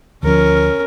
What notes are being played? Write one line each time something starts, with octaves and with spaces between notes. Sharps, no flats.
D2 F3 C#4 A#4